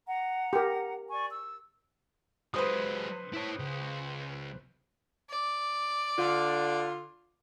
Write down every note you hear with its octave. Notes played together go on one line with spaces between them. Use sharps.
F#5 A#5
G4 A#4
D5 G#5 C#6
E6
F#3 G#3 B4 C5 D#6
E4 C#5
C#2
D5
D3 F4